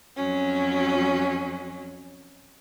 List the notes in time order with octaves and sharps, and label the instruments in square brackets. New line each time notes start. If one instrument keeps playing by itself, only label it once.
[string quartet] F2 F#3 C#4